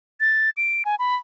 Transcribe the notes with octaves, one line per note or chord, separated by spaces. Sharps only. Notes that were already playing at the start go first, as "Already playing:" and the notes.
A6
D7
G#5
B5